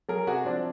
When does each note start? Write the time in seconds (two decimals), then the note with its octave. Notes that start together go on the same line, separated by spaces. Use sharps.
0.09 F#3 G#4 A#4
0.27 C3 F#4 G#4
0.45 F3 C4 D4